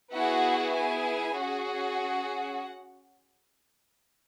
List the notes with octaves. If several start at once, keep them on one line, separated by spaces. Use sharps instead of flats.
B3 E4 F#4 G#4 F#5
G#4 G#5
C#4 F#4 G#4 F#5